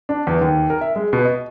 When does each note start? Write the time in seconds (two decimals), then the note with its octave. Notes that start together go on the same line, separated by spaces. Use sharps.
0.09 D4
0.27 E2
0.41 D#2
0.70 A#4
0.81 E5
0.96 G#3
1.13 B2
1.25 D#5